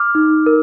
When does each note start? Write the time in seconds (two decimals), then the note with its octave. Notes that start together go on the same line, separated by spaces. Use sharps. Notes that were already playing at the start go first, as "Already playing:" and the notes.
Already playing: D6 F6
0.15 D#4
0.46 A#4